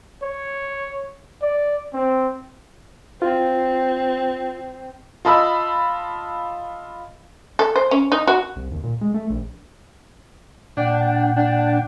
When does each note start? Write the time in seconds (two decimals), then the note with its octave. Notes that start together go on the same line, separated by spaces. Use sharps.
0.23 C#5
1.42 D5
1.93 C4
3.22 C4 F4
5.25 F4 D#5 A5 B5 E6
7.59 A4
7.76 C5
7.91 C#4
8.12 D#4
8.27 F#4
8.56 C2
8.72 D#2
8.83 A#2
9.01 G#3
9.14 A3
9.30 A#1
10.77 A#2 D4 F#5 G5
11.36 D4